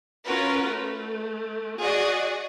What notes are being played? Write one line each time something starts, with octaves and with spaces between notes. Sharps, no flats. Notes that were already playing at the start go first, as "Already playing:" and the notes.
C#4 F4 F#4 A#4 B4
A3
F#4 G#4 D5 D#5